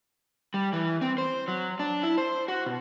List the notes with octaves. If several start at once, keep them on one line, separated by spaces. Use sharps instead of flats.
G3
E3
C4
C5
F#3
D4
E4
C5
F#4
B2